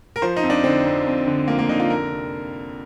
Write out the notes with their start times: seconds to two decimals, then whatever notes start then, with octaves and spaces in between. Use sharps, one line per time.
0.16 A#4
0.22 F3 C5
0.36 D#4
0.43 F2
0.50 D4
0.64 D3 C4
0.86 F2
1.07 F2
1.27 D3
1.48 F3 A#3
1.59 A#3
1.69 D3 D#4
1.80 F4
1.90 F2 A#4
2.11 C3